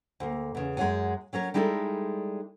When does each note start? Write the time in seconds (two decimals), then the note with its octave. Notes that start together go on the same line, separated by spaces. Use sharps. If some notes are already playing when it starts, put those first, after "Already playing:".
0.20 D2 A#3
0.55 E2 C#3
0.77 F#2 G#3 G#4 C#5 F#5 G#5
1.33 F#3 C#4 A#4 C#5
1.54 G3 G#3 D#4 E4 G#4 A4